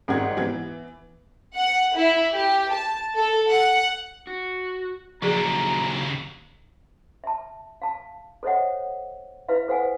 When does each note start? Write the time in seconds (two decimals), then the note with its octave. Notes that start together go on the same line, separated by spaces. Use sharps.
0.08 G#1 G#2 C4 F#5 G#6
0.37 E3 B3 G#6
1.55 F#5
1.96 E4
2.33 G4
2.72 A5
3.16 A4
3.49 F#5
4.27 F#4
5.22 D#2 A#2 C#3 F3 F#3 G#4 A#5
7.24 E5 A5
7.82 F5 A5
8.43 A4 C5 C#5 D#5 E5 F#5
9.49 E4 B4 E5 F5
9.68 A4 C5 F5 F#5 G#5